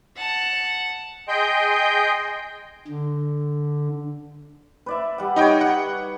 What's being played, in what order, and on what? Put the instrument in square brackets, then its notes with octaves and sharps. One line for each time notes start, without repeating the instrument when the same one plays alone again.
[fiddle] F#5 A5
[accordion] G#4 D#5 G5 C6 G6
[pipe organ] D3
[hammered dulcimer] B4 D5 E5
G3 F#5
[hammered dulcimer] G3 C#5 [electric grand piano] D#4 D#5 G5
[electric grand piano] F#5